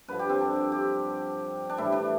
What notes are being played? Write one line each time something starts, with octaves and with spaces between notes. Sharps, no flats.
G2 D3 F3 B4
G4
C4
D4
G4
D4
A2 E3 G3 E4
D4